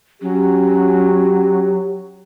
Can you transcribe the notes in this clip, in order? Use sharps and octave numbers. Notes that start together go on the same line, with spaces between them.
F#3 C#4 G4